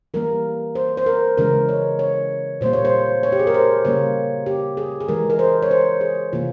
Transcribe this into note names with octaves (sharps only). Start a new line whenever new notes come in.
E3 G3 A#3 A#4
C5
C5
A#4
C#3 E3 G#3 A#4
C#5
C#5
A#2 G3 A#3 C5
C#5
C5
C#5
G4
G#4
A#4
C5
C#3 G3 A#3 C#5
G4
G#4
G#4
E3 G#3 A#4
A#4
C5
C#5
C5
G#4
C3 E3 A#3 F4